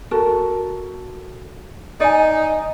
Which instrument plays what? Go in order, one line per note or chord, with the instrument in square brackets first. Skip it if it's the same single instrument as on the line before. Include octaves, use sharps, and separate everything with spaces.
[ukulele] F#4 A4 A#4
[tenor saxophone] D#4 [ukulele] D5 G#5